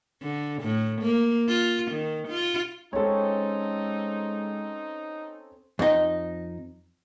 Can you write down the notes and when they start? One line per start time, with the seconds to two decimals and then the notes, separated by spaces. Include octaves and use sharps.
0.22 D3
0.62 A2
1.01 A#3
1.48 F4
1.91 D#3
2.28 F4
2.93 G#3 C4 C#4 D#4 A4 C#5
5.79 F2 D#4